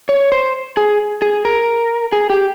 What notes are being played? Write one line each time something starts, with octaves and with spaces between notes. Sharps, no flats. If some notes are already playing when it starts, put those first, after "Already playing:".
C#5
C5
G#4
G#4
A#4
G#4
G4